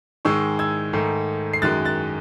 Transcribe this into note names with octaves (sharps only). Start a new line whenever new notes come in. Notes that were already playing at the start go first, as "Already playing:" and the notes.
G#2 D#3 G#3 C#6 E6
E6 G#6
G#2 D#3 A3
C7
F#2 D#3 G#3 F#6 A6
F#6 A6